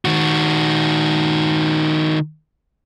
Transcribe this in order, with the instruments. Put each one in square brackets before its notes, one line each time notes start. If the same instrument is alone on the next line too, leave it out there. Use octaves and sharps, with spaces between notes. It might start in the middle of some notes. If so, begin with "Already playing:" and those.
[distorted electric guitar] D#3 F#4